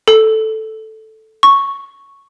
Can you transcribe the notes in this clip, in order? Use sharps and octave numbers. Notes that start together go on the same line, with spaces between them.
A4
C#6